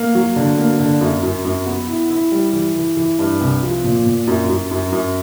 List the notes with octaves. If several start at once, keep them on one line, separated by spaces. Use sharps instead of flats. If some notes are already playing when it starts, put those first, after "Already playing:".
Already playing: A#3
F#3
D3
A#3
D3
F#2
F#2
F#2
B3
E4
E4
G3
E3
E3
E3
G2
C2
F3
A#2
A#2
F#2
F#2
F#2
F#2